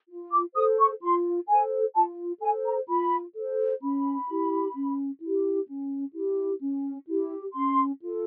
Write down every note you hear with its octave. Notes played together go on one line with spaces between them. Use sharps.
F4
D6
A4 C5 D#6
C#6
F4 C6
A4 C5 G#5
F4 A5
A4 C5 G#5
A#5
F4 B5
A4 C5
C#4 B5
E4 G4
C#4
E4 G4
C#4
E4 G4
C#4
E4 G4
C#4 C6
F4 A4